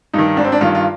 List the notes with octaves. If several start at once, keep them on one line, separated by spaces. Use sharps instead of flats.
G2 D#3 D#4
G#1 D4
C4
D4
G2 D#3 F4
F4